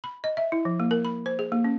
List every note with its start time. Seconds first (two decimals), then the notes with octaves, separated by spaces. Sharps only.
0.04 B5
0.24 D#5
0.37 E5
0.52 E4
0.65 F3
0.80 A#3
0.91 A#4
1.05 B5
1.26 C5
1.39 G#4
1.52 A#3
1.64 C#4